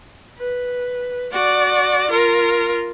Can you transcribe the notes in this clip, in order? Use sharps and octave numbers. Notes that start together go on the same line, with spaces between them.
B4
F#4 D5
F4 A#4